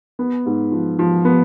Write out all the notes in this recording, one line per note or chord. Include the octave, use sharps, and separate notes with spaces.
B3
G#2
F3
F3
B3